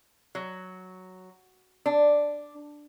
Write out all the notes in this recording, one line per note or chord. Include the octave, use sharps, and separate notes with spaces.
F#3
D4